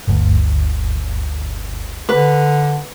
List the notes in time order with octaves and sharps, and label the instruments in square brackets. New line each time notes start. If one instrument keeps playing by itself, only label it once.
[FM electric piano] G1 D2
[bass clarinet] D3 [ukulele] B4